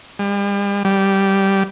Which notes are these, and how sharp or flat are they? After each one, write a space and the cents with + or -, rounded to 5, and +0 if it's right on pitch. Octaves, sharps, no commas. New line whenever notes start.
G3 +45
G3 -5